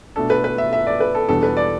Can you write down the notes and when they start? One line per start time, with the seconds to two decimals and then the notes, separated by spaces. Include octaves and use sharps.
0.16 B2 A3 D4 A4
0.30 B4
0.44 B4
0.58 E5
0.73 E5
0.87 D5
1.00 B4
1.15 A4
1.29 E2 B2 G3 D4 A4
1.43 B4
1.57 D5